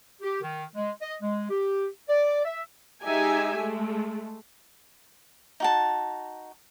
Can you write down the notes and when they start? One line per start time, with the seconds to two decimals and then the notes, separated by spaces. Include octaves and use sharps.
0.22 G4
0.42 D#3
0.75 G#3
1.01 D#5
1.22 G#3
1.49 G4
2.08 D5
2.45 E5
3.04 G#3 D#4 G4 E5 G#5
3.57 G#3 A3
5.60 D#4 F#4 A5